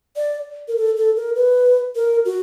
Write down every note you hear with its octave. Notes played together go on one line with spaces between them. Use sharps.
D5
A#4
A4
A4
A#4
B4
A#4
F#4